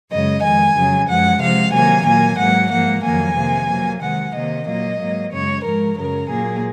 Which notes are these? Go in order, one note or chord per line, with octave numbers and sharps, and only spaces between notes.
F#2 C#3 G#3 D#5
F2 D#3 G#3 G#5
F2 C#3 F#3
F#2 F3 G#3 F#5
C3 F3 G#3 F5
C3 D#3 F#3 A#3 G#5
A#2 F#3 A#3 G#5
G#2 F#3 A#3 F#5
G#2 F3 A#3 F#5
F2 D#3 F#3 A#3 G#5
C3 D#3 A#3
C3 F#3 A#3
C3 D#3 G#3 F#5
C3 D#3 A#3 D#5
A#2 F#3 A#3 D#5
G#2 F#3 A#3
F#2 C#3 G#3 C#5
G#2 F3 G#3 A#4
F#2 C#3 F#3 A#4
A#2 F#3 A#3 G#4